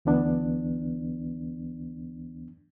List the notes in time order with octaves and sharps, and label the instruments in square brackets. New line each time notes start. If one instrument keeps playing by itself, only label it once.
[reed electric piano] D2 E3 B3 D4